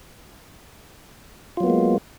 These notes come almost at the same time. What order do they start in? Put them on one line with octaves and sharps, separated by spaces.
F4 F#3 B3 A#3 G#3